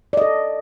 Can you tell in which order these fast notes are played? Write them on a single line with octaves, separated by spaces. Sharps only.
D5 D#5 A4